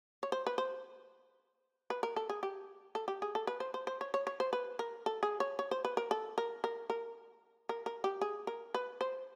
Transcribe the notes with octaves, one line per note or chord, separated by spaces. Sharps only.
C#5
C5
B4
C5
B4
A#4
A4
G#4
G4
A4
G4
G#4
A4
B4
C5
C5
C5
C#5
C#5
C#5
C5
B4
A#4
A4
G#4
C#5
C#5
C5
B4
A#4
A4
A#4
A#4
A#4
A#4
A#4
G4
G#4
A#4
B4
C5